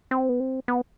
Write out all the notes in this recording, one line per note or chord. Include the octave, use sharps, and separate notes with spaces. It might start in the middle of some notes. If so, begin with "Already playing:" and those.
C4
B3
C4
B3